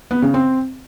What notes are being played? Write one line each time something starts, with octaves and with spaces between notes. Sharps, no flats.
B3
C#3
C4